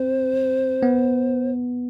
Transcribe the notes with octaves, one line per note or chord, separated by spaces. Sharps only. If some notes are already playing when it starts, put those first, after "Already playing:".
Already playing: C4 C5
B3